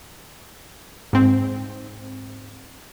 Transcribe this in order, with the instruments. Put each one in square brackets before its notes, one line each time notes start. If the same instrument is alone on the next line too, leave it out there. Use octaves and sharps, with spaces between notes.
[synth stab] G#2 C4